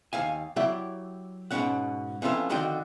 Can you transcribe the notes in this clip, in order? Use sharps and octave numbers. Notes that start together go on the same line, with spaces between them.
D#2 F5 G#5
F#3 E4 G4 D5
G#2 B2 F3 C4 C#4 F#5
F2 E3 C#4 F4 A4
F2 D3 D#3 F#4 D#5 G5